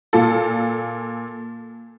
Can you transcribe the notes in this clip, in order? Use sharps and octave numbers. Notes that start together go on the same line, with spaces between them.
A#2 F4 A4